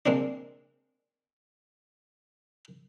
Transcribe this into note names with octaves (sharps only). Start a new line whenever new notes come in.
G#3 A#3 C4 D4